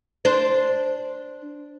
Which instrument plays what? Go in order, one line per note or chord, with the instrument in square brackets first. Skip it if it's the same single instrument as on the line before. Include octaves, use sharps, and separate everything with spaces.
[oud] D4 C5